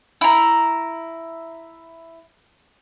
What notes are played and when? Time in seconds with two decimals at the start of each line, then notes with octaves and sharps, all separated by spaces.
0.21 E4 A#5